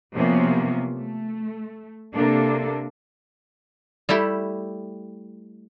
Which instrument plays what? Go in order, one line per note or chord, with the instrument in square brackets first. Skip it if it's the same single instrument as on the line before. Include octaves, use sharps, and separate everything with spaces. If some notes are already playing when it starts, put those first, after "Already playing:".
[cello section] C3 F3 F#3 A#3 B3 C#4
A3
C3 A#3 D4 A4
[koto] G3 A3 E4 G4